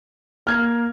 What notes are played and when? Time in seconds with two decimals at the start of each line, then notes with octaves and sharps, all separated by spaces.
0.47 A#3 F6 G#6